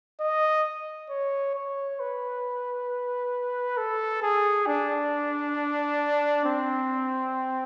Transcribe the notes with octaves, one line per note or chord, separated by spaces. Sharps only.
D#5
C#5
C#5
B4
A4
G#4
D4
C4